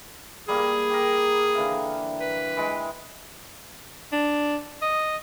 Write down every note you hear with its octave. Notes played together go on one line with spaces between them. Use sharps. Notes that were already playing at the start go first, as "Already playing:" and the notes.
G3 A#3 G#4
G4 A#4
D3 E3 F5
B4
E3 G#3
D4
D#5